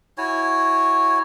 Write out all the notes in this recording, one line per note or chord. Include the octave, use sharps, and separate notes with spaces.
E4 F#4 C#5 G#5